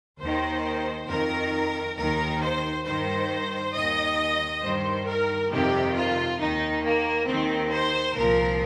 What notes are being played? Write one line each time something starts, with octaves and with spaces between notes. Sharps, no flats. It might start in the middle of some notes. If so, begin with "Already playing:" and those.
D#2 D#3 C5
F2 D#3 A#4
D#2 D#3 A#4
C5
G2 D#3 C5
D#2 D#3 D#5
G2 D#3 C5
A#4
F2 C3 D#3 G4
F4
D#2 D#3 D#4
A#3
D#2 D#3 C4
C5
C2 A#2 F3 A#4